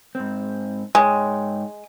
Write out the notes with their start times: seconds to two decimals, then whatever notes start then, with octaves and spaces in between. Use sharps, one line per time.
0.15 G#2 C4
0.95 G#2 G#3 C#5 G5